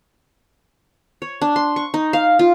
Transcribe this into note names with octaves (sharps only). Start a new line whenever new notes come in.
C#5
D4
C6
C#6
D#4
F5
F4